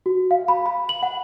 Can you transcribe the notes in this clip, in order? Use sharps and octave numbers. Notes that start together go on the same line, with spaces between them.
F#4
F5
B5
B5
F#7
F#5